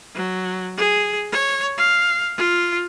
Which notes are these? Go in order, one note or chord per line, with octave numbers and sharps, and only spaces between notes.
F#3
G#4
C#5
F5
F4